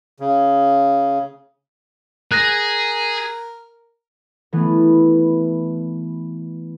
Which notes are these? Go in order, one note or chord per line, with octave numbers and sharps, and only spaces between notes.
C#3
G#4 A#4 F#6 A#6
E3 A3 B3